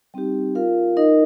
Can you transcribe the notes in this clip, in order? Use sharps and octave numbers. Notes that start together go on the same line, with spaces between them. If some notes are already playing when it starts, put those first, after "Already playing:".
G3 C4 D#4 G4
F4 A#4 F5
D#4 A#4 D#5